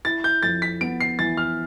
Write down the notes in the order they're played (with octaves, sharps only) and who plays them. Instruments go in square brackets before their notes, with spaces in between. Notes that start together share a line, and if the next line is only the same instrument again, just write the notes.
[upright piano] E4 [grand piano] A6
[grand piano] G6
[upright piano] F2 [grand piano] A6
[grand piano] B6
[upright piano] B3 [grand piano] D7
[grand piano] C7
[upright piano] E3 [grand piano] A6
[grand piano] F6